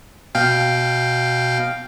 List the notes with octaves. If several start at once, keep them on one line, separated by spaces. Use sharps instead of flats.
B2 F5 G5